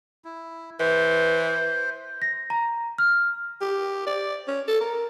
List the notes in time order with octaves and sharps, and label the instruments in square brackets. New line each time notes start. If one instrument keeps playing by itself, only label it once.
[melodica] E4
[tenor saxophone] E3 [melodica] C5
[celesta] A#6
A#5
F6
[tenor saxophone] G4
D5
C#4
A4
A#4